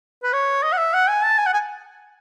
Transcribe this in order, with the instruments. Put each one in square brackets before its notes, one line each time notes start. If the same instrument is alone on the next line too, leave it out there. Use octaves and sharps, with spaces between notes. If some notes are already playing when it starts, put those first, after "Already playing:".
[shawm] B4
C#5
D#5
F#5
E5
F#5
G#5
A5
G#5
F#5
G#5